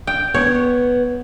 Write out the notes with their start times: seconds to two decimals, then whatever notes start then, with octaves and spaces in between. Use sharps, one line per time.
0.07 G5
0.34 B3 C#5